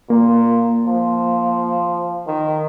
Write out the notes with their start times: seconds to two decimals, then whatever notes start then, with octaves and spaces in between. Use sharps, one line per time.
0.10 A#2 A#3
0.86 F3
2.27 D#3